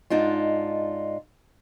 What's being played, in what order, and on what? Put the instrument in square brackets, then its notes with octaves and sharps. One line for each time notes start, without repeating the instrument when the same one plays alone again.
[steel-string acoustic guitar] G#2 D4 D#4 F4